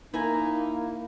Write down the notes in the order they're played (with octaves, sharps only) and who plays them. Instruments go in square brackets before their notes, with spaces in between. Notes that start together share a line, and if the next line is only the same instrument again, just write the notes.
[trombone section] A#3 [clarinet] D#4 [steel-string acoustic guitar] E4 G#5 A#5